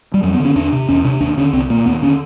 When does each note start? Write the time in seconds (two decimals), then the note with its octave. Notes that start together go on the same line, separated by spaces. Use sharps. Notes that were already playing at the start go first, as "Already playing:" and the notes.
0.14 G3
0.23 F2 F#3
0.34 B3
0.40 D3
0.45 C#4
0.55 E2 D4
0.72 C3
0.88 E2 C#4
1.05 C3 D4
1.20 D#2 D4
1.37 D3 C#4
1.53 C2 C4
1.70 A#2 A#3
1.86 D#2 B3
2.02 D3 C#4